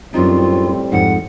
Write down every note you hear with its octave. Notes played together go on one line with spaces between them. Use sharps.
F#2 A2 G3 C4 D#4 F4
F2 G#2 F#5